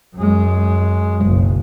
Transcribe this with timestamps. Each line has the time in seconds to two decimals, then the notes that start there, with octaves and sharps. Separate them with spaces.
0.15 F#2 G#3
1.24 F#1 B1